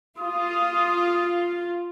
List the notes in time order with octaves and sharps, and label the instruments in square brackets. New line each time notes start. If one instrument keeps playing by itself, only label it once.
[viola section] F4 [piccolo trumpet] D#6